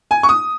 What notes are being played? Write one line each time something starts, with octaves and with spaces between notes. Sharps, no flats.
G#5
C#6
D#6